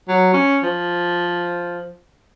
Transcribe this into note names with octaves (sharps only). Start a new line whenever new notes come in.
F#3
C#4
F3